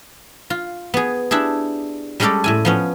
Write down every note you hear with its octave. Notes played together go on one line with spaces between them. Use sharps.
F4
B3 G#4
D4 E4 G4 G#4
G3 G#3 C#4 G4 A4 D5
A2 E4 G#5
F3 B3 C#4